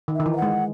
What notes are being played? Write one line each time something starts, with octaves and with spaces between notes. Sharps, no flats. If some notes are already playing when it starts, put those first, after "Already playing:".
D#3
E5
D#3
E3
E5
F#5
G#3